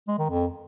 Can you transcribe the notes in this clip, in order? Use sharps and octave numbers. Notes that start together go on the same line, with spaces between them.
G#3
D#3
F2